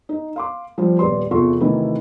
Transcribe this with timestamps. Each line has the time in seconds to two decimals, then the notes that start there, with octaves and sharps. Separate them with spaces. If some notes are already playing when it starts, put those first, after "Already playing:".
0.09 D#4
0.36 F5 C6 D6
0.78 F3 G3 C5
0.99 D#1 G4 B4 D5 C6
1.31 E2 C3 F4 A4 C6 C#6
1.60 C3 D#3 E3 F#3 A3 E4